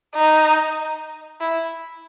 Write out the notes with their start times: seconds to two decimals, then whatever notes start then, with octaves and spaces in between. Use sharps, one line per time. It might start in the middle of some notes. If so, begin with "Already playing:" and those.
0.15 D#4
1.41 E4